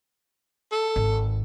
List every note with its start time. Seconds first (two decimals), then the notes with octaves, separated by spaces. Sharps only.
0.72 A4
0.96 G#1